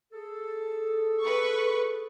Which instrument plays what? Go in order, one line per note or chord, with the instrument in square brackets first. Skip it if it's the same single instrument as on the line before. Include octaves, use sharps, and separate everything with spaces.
[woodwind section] G#4 A4
[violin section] B4 C#6